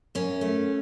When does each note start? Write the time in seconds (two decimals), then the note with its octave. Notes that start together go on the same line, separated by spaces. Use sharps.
0.15 F#2 C#4
0.41 A3